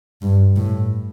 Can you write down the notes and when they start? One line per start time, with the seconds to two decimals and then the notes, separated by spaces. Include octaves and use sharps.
0.22 G2
0.56 A2